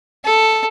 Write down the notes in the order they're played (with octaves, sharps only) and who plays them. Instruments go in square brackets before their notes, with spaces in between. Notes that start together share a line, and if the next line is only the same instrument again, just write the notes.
[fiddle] A4